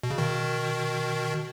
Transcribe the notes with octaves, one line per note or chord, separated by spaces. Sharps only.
B2
C#3
B2 D#3